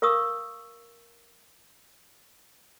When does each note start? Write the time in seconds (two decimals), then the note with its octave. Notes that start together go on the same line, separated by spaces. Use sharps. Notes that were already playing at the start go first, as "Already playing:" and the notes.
0.02 A#4 F5 C#6 D#6 E6